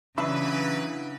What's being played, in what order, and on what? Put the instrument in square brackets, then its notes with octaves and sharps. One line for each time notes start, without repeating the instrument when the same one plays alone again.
[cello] C#3 [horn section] E3 F#3 B4 [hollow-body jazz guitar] D4 E5 B5